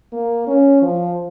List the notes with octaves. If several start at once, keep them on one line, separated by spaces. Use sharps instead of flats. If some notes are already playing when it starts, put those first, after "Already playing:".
A#3
C#4
F3